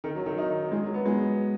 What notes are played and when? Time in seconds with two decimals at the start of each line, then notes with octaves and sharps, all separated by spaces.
0.04 D#3
0.15 F#3
0.26 D#3
0.38 D#4
0.72 G#3
0.83 F#3
0.94 B3
1.06 G#3